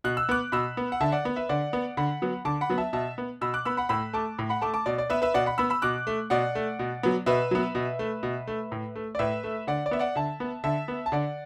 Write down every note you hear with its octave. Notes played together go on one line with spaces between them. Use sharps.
B2 F#6
E6
B3 D6 F#6
B2 B5 E6
B3
F#5
D3 E5 A5
D5 F#5
B3
B4 E5
D3 D5 F#5
B3
D3 F#5 B5
F#3 B3
D3 A5 D6
F#5 B5
F#3 B3
E5 A5
B2 E5 A5
B3
B2 B5 E6
D6 F#6
B3 B5 E6
F#5 B5
A2 B5 E6
A3 A5 D6
A2
F#5 B5
A3 A5 D6
A5 D6
B2 D5
D5
B3 B4 E5
B4 E5
B2 D5 F#5
F#5 B5
B3 B5 E6
B5 E6
B2 D6 F#6
A3
B2 D5 F#5
A3
B2
F#3 B3
B2 B4 E5
F#3 B3
B2
A3
B2
A3
A2
A3
D5
A2 B4 E5
A3
D3 D5 F#5
D5
B3 E5
D5 F#5
D3 E5 A5
B3
D3 E5 A5
B3
A5
D3 D5 F#5